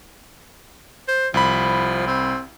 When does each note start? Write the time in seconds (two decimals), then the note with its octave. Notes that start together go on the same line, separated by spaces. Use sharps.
1.08 C5
1.34 C2 F3 B5
2.07 C4